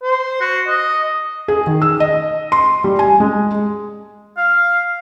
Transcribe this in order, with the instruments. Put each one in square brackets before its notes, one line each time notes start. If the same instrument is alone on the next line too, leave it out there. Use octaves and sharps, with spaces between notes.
[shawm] C5
F#4
D#5
[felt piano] G#4
D#3
E6
D#5
C6
G3
G#5
G#3
[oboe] F5